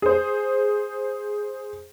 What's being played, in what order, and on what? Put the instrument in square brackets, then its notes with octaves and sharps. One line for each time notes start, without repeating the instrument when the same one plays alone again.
[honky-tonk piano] G#4 C5